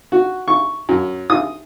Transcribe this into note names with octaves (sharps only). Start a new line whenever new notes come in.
F#4
C#6
F#2
D#6